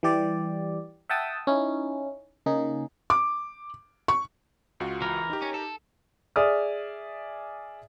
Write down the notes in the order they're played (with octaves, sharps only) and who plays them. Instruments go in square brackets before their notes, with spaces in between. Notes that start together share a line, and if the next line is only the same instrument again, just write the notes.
[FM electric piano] E3 G3 G4 D5
E5 F#5 G5 A5 D#6 E6
C#4 D#4 E4
C#3 A#3 D#4 G#4
[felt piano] D6
C#6
[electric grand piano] C#2 F4 F#4
[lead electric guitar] E3 [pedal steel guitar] A#4
[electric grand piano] D#4 G4
[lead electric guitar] C#4
A4
[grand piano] G#4 D5 E5 D#6 F6